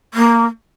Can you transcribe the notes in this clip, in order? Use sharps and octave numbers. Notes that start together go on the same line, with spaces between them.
A#3